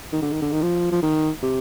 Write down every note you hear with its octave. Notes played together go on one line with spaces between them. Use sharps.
D#3
D3
D#3
D3
D#3
F3
F3
D#3
C3